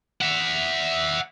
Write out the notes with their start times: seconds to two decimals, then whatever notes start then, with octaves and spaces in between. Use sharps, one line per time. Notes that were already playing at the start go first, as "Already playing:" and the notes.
0.21 E5 F#5